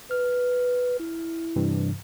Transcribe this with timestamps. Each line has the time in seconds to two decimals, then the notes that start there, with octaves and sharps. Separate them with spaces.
0.11 B4 F6
1.00 E4
1.56 G2 C3 E3